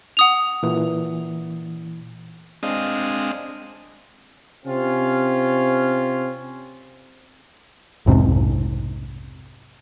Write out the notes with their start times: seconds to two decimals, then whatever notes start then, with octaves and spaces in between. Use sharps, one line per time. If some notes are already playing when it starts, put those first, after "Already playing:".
0.17 F#5 D#6 F7
0.63 A#2 E3
2.63 G#3 C4 D4 D#5 F5 D#6
4.66 C3 C4 C#4 F4
8.06 B1 F2 G#2 C3